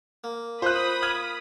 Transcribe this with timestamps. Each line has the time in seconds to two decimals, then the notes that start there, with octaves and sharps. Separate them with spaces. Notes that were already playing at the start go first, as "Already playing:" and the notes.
0.24 A#3
0.62 F4 C5 B5 D#6 F#6
1.02 F6 G#6 F#7